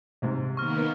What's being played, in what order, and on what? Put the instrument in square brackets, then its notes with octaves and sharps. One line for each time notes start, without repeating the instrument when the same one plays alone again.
[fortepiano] C2 G#2 C3
[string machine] D#3 A#3 B3 [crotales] C#6 F6